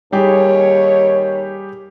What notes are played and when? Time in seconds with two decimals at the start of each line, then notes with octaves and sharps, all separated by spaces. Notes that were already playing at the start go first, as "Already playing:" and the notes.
0.12 D#2 G3 G4 G#4 C#5